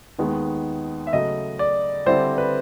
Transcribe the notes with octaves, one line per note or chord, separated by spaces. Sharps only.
D#2 D#3 G#3 B3
E5
C#3 F#3 A3 D#5
D5
D3 G3 C4 E4 C5
B4